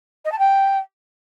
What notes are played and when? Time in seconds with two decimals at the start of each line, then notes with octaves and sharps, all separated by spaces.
0.25 D#5
0.32 A5
0.39 G5